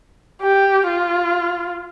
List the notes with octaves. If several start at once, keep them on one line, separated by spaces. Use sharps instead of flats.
G4
F4